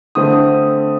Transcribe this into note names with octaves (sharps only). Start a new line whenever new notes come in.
D3 A3 C4 D#6